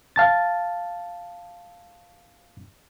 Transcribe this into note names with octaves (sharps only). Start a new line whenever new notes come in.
F5 A5 A6